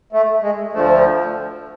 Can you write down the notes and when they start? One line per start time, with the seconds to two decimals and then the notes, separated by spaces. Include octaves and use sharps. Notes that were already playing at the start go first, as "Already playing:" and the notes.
0.13 A3
0.42 G#3
0.73 D2 D3 F3 A3